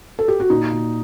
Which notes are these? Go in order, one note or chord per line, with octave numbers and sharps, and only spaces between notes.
A4
G4
F#4
A#2 D#4
A#2